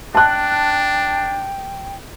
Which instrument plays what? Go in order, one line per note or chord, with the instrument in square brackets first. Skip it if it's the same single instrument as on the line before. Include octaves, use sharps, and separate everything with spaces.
[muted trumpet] D4 [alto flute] G5 [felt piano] A5 F#6